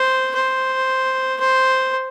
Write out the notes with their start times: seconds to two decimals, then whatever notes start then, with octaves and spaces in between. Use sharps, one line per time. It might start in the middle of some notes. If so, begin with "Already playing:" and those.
Already playing: C5
0.35 C5
1.40 C5